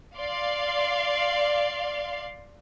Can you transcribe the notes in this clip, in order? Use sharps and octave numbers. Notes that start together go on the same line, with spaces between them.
D5 F5 C6